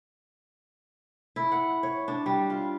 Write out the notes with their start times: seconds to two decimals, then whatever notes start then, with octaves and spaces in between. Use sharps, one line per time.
1.36 E4
1.52 F#5
1.83 C#5
2.08 D4
2.26 G3
2.50 F4